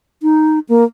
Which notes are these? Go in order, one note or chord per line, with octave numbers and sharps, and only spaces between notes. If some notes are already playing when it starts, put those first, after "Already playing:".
D#4
A#3